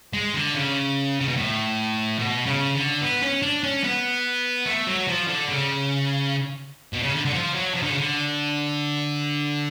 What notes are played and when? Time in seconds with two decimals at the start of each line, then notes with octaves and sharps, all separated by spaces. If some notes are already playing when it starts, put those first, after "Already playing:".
0.13 G#3
0.34 D3
0.55 C#3
1.21 C#3
1.29 B2
1.37 A2
2.19 B2
2.46 C#3
2.74 D3
3.01 B3
3.22 C#4
3.42 D4
3.63 C#4
3.84 B3
4.66 A3
4.87 F#3
5.08 F3
5.28 D3
5.48 C#3
6.93 B2
7.03 C#3
7.13 D3
7.25 D3
7.34 F3
7.54 F#3
7.75 F3
7.83 D3
7.90 C#3
7.98 D3